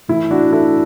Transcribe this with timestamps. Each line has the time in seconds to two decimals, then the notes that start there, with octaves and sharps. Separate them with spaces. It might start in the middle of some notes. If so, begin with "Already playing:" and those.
0.08 A2 E3 E4
0.31 D4 F#4
0.52 E4 A4